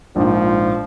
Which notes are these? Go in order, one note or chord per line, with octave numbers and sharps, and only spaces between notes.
A#1 G#2 F3